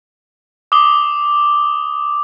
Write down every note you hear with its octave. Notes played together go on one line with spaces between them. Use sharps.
D6 D#6 G7